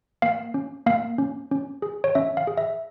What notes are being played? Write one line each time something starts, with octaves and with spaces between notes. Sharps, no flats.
A#3 F5
C#4
A#3 F5
C#4
C#4
G#4
C#5
C#4 E5
F5
G#4
E5